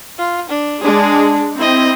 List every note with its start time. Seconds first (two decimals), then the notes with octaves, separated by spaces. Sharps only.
0.19 F4
0.50 D4
0.84 G#3 D4 G#4
1.58 C4 E4 D#5